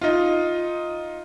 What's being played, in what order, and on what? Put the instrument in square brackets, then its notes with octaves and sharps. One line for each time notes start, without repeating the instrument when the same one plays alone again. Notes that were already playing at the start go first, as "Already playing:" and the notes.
[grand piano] D#4 F4